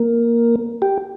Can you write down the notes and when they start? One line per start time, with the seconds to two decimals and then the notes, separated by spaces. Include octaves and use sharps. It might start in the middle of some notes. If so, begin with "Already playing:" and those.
Already playing: A#3
0.82 G4